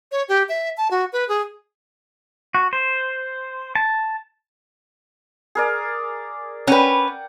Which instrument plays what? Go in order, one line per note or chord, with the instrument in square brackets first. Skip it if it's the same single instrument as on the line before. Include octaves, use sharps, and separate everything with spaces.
[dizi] C#5
G4
E5
A5
F#4
B4
G#4
[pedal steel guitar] F#4
C5
A5
[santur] G#4 A#4 D5
[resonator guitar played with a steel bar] C#4 B4 [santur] F#5 G5